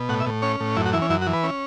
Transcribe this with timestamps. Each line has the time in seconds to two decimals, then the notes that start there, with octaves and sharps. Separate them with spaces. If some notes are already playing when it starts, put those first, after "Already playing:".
Already playing: B2
0.09 A2 F#5
0.20 E5
0.26 A2
0.42 C#4 C#5
0.60 A2
0.76 F#2 E4
0.85 F#4
0.93 E3 E4
1.02 C#4
1.10 F#2 E4
1.22 F#4
1.27 E3
1.33 B4
1.44 C#4